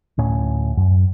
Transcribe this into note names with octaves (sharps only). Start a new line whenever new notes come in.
D2 A2 C#4
F#2